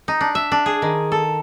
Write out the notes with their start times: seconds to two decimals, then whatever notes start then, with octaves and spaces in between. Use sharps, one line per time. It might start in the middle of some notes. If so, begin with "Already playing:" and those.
0.08 D#4
0.21 D4
0.35 E5
0.52 D4
0.66 G#4
0.82 D#3
1.12 A4